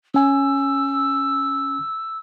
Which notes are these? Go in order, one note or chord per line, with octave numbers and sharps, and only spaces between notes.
C#4 G#5 E6